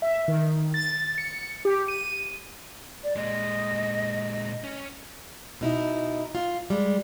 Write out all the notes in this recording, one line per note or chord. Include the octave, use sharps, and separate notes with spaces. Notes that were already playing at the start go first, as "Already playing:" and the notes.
E5
D#3
A6
C#7
G4
D#7
D5
A#2 G#3 D#5
C#4
B2 D#4 E4
F4
G3 G#3